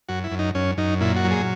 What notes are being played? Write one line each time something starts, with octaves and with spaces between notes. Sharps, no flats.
F#2 F#4
E4
F#2
D#4
F#2 C#4
F#2 D#4
A#2 E4
F#4
F#3
G#4